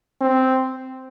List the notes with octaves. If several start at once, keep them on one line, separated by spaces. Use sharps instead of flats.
C4